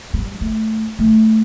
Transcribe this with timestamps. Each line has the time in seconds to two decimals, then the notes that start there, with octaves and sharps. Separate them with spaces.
0.14 G3
0.41 A3
0.99 A3